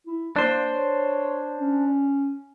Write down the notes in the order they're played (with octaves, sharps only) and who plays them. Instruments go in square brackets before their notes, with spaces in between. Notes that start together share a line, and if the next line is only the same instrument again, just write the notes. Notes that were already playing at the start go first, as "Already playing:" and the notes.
[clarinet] E4
[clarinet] A#3 [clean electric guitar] D4 C5
[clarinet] C#5
C#4